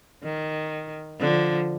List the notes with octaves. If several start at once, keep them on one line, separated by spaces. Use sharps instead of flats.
D#3
D3 F3